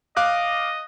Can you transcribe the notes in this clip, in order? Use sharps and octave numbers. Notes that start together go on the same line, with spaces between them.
D#5 F5 D6 F#6